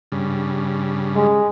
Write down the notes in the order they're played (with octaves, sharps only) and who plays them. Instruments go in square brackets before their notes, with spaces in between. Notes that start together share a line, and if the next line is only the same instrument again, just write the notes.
[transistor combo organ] G2 C#3
[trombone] G#3